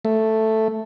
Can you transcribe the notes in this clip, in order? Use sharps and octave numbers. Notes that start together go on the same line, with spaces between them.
A3